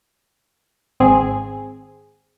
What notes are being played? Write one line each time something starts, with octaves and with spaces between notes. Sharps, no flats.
G#1 C4 G#4